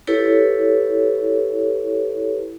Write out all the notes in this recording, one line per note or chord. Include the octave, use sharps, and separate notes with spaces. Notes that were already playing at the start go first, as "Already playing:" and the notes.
E4 G4 A4 B4 C#5